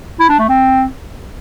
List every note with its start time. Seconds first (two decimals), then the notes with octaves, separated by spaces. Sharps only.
0.20 E4
0.29 D4
0.39 A3
0.49 C4